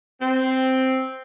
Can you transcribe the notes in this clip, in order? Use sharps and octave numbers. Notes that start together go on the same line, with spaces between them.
C4